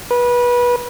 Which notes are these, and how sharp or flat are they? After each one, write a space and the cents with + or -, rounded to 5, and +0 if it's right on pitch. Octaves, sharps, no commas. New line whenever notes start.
B4 -25